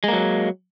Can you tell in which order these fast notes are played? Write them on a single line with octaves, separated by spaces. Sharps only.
G#3 A#3 F#3